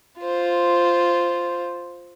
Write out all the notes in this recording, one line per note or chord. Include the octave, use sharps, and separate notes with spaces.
F4 C5